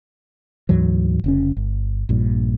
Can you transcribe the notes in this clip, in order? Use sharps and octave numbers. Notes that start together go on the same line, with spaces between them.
D2 G#2 E3 F#3
F1 C#3 C#4
G1
A#1 G2 A#2